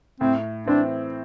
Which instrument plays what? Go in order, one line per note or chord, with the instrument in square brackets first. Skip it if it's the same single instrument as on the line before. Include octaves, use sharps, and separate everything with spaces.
[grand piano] A2 [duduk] C4
[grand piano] E3 C4 [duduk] D4